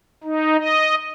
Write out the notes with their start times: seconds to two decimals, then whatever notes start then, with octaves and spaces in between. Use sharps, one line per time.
0.24 D#4
0.57 D#5